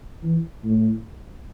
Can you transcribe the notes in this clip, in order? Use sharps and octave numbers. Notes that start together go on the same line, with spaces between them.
E3
A2